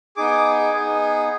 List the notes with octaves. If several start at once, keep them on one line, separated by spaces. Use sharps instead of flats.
B3 D#4 G#4 D6
B3 D#4 G#4